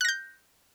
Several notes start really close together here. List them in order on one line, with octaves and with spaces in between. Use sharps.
F#6 A#6 G6